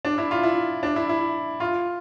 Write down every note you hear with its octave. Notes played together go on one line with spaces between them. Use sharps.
D4
E4
F4
E4
D4
E4
E4
F4